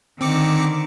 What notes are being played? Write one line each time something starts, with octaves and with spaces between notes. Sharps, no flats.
D3 D#3 C4 D6 C#7